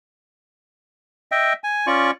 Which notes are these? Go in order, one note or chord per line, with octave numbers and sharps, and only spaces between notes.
D#5 E5 G5
G#5
C#4 F4 D5 C#6